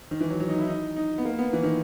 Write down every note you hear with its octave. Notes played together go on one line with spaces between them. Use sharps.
D#3
E3
F#3
F#3
D#4
E4
D#4
D#4
B3
A#3
B3
E3
D#3